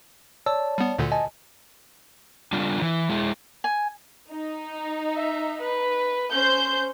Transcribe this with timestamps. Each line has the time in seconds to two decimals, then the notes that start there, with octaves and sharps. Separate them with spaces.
0.46 C#5 D5 A5 E6
0.78 G3 B3
0.99 D2 A#2 D3
1.12 D#5 G#5 A5
2.53 G3 D4 F4
2.82 E3
3.09 G#3 E4
3.64 G#5
4.31 D#4
5.16 E5
5.61 B4
6.34 C#4 C5 G6